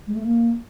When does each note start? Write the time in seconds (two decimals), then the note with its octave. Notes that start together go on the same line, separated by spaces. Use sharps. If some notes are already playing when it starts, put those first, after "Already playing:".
0.07 G#3
0.14 A3
0.22 A#3